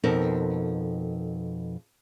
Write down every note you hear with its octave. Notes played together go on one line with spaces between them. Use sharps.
F2 B2 D#4 A4 A#4